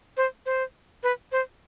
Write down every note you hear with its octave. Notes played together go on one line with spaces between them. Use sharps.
C5
C5
B4
C5